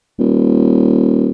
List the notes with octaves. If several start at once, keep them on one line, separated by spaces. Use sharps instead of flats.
D#1